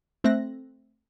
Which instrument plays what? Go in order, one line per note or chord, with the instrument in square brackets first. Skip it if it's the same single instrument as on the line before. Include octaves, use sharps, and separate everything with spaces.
[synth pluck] A3 C4 E5 F#6 A#6